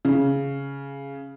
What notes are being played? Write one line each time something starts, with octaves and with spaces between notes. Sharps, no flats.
C#3